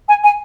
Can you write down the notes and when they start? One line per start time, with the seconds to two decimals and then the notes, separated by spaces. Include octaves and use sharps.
0.08 G#5
0.24 G#5